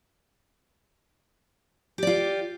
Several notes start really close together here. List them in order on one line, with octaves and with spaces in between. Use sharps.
G4 D5 F4